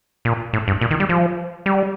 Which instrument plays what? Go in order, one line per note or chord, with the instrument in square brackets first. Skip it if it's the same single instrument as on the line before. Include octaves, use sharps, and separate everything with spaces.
[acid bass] A#2
A2
G2
A#2
D#3
G3
F3
G3